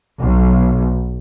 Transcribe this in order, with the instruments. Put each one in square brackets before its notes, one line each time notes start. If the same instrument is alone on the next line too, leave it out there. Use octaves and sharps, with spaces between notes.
[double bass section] B1